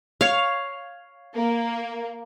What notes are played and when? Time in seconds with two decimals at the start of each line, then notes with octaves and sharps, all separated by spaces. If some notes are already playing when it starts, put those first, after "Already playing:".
0.21 C#5 F5
1.37 A#3